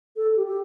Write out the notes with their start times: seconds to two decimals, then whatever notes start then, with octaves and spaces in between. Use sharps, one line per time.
0.16 A4
0.36 G4
0.47 G4